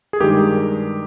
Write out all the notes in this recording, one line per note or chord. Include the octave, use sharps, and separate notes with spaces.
G#4
G2 D#3 G#3 G4 A#4